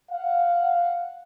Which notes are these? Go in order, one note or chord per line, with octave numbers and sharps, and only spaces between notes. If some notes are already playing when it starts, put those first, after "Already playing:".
F5 F#5